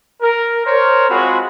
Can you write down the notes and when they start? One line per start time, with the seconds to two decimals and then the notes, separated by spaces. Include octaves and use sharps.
0.22 A#4
0.65 A#4 C5 C#5
1.09 G#3 C4 F4 F#4 G#4 B5